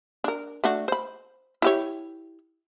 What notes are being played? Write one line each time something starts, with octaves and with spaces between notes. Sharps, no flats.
D4 A#4
A3 D4 F#4
C5 B5
E4 G4 C#5